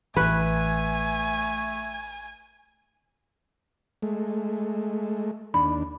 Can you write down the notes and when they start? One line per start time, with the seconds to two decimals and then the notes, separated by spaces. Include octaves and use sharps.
0.17 A1 E3 A3 B4 G#5
4.03 G#3 A3
5.54 D#2 D4 B5